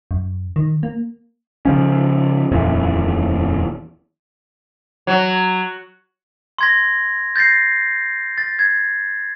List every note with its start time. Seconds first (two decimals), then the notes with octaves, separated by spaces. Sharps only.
0.11 F#2
0.56 D#3
0.83 A#3
1.65 C#3 F3 C#4
2.51 D#1 F2 A#2 E3
5.07 F#3
6.58 C6 G#6 A#6
7.36 G6 A6 A#6 C7
8.38 A6
8.59 G#6